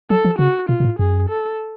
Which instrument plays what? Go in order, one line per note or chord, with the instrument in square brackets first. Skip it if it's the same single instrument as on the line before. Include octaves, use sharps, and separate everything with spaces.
[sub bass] F#3 [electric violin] A4
[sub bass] F3
[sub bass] C#3 [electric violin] F#4
[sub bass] B2 [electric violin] F4
[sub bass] B2
A2
[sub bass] F#2 [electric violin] G#4
[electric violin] A4